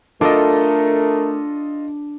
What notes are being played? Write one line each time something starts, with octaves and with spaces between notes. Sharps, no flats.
A3 D4 F4 A4 A#4 D#5